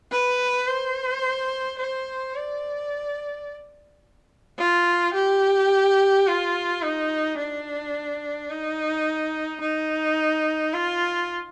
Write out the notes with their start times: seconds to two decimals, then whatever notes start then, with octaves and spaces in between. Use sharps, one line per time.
0.12 B4
0.67 C5
1.79 C5
2.35 D5
4.58 F4
5.14 G4
6.26 F4
6.82 D#4
7.38 D4
8.50 D#4
9.61 D#4
10.73 F4